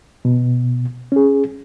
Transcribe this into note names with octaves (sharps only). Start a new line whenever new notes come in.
B2
C#4 G#4